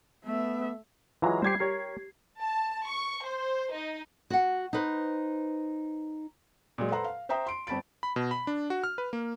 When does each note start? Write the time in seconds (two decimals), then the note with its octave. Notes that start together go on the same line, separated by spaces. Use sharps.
0.25 A3 B3 E5
1.22 E3 F#3 G#3 F4 A#5
1.42 G3 G4 C5 G#6 C7
1.60 G4 A#4 C#5
2.40 A5
2.88 C#6
3.24 C5
3.73 D#4
4.30 F#4 F#5
4.73 D#4 B4 C5
6.78 A#2 F#3 G#3
6.90 A4 B4 C5 F#5 A#5 C6
7.04 F5
7.29 C5 E5 G5 A#5 D#6
7.47 C6 D7
7.67 G1 C4 A5 B5 A6 D7
8.03 B5
8.16 B2
8.31 B5
8.47 D4
8.70 F#4
8.84 F6
8.98 B4
9.13 A#3